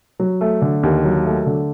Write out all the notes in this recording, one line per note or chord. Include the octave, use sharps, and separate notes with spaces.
F#3
A3
D3
D#2
F#3
A3
D3